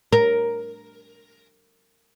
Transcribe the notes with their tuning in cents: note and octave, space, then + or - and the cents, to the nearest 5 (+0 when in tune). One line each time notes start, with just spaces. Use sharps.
A#4 +5